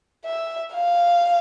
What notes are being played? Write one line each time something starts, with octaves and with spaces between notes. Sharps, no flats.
E5
F5